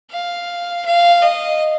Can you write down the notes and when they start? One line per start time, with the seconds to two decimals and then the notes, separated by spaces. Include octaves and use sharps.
0.11 F5
0.86 F5
1.22 D#5